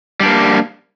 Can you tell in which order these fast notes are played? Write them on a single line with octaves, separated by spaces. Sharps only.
G3 D4 A#3